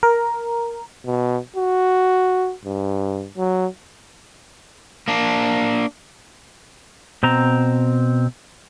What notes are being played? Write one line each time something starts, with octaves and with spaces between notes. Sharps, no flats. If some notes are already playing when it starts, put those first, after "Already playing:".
A#4
B2
F#4
G2
F#3
A#3 D4
B2 C4 A#5